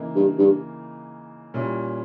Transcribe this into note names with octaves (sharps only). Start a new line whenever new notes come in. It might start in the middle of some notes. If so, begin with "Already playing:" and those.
Already playing: C#3 E3 A#3 D#4
G2
G2
A#2 G3 C#4 E4